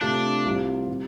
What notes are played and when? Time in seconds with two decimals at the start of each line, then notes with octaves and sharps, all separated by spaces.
0.01 C3 A3 D4 F4
0.45 C2 C3 G3 C4 F4
0.88 C3 G3